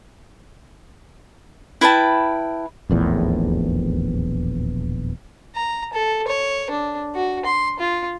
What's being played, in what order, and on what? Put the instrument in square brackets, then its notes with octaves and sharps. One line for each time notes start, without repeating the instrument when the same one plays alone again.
[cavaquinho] E4 B4 G5 A5
[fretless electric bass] D#1 A#1 E2 A2
[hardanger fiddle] A#5
A4
C#5
D4
F#4
C6
F4